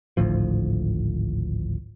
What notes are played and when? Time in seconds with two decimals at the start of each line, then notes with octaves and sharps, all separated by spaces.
0.17 G#1 D2 A2 F3